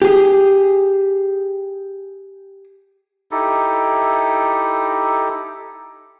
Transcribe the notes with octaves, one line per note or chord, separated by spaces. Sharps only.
G4 G#4
D#4 E4 G4 A4